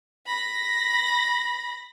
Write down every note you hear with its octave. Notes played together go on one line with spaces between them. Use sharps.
B5 A#6